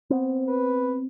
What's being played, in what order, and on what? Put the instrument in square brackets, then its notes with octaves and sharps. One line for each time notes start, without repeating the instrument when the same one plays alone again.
[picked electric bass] B3 C4
[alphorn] B4